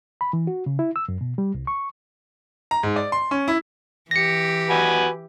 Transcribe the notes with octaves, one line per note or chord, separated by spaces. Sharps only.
B5
E3
F#4
C#3
E4
E6
F#2
B2
G3
C2
C#6
A#5
G#2
D5
C6
C#4
E4
E3 G4 A#6 C#7
F#4 B4 G#5